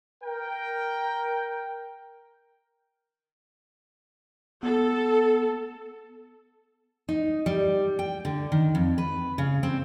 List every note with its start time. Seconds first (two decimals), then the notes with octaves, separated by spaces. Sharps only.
0.23 A#4 G5
4.63 B3 A4
7.09 D#4
7.46 G3
7.99 G5
8.25 D3
8.52 D#3
8.75 F2
8.98 B4
9.38 C#3
9.63 C4